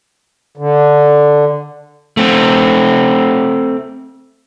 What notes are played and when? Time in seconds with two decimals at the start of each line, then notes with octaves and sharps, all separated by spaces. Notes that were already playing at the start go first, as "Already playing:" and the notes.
0.57 D3
2.17 A3 C4